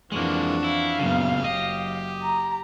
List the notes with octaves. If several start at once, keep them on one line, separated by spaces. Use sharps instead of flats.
F2 E3 G#3 A#3 D4 F#4
E4 F5
F#2 A#2 C#3 B3
F#1 F#3 G4 D#5
A#5